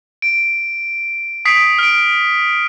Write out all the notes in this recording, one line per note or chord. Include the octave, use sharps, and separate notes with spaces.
D7
D#6 B6 C7 D7
F6 D7